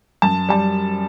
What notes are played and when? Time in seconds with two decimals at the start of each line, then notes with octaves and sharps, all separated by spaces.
0.22 F#2 A5
0.49 G3 A5